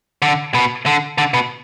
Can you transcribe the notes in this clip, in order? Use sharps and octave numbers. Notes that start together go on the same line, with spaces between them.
D3
B2
D3
D3
B2